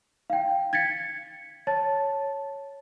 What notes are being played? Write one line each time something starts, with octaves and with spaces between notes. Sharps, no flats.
F5 G5
G#6 A6 B6 C#7
C#5 A5 A6